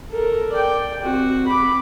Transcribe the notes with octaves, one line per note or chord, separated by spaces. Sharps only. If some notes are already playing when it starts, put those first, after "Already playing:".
A4 A#4
D5 G5
C4 F#4
B5 D6